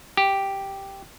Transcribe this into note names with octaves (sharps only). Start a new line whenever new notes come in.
G4